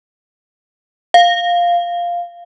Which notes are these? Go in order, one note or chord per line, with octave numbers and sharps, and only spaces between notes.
F5